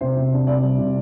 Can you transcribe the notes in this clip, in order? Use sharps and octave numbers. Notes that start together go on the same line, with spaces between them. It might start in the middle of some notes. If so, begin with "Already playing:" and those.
C3 C5
C3
D4
C3 D5
G3
C3